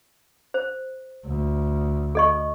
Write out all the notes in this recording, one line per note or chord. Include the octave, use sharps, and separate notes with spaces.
C5
D2
A4 D#5 C#6